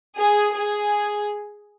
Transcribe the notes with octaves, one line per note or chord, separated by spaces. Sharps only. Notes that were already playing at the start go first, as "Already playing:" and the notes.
G#4
G#4